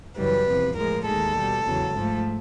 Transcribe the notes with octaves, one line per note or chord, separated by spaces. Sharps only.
F#2 C#3 E3 G3 B4
E2 C3 F3
A2 F3 G#3 A#4
D#2 D#3 G#3 A4
B2 G3
E2 C#3 F#3
G#2 F3 A3